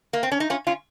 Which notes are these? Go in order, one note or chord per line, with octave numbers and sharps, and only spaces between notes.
A#3
C4
C#4
D#4
C#4 F4
C#4 F4